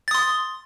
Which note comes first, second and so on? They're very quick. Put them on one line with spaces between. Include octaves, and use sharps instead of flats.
A6 D#6 C6